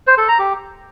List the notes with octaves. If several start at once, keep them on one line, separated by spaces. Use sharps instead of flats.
C5
A4
A#5
G4